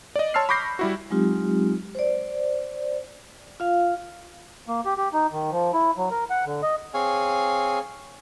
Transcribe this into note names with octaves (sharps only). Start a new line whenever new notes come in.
D5 D#5
C#5 A5 C6 E6 F6 C7
B5 C#6 D6 G6 A#6 C7
G3 E4 F#4
F#3 G#3 C4 D#4 F4 G4
C5 D5
F4 F5
A#3
G4
G4
D#4
D#3
F3
E4
F#3
A#4
F#5
D3
D#5
C4 G#4 C#5 F5 G#5